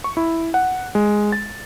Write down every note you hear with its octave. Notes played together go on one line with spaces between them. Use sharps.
C#6
E4
F#5
G#3
A6